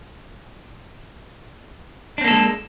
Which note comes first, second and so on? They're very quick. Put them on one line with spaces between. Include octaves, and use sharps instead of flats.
D4 C4 A#3 A4 G#3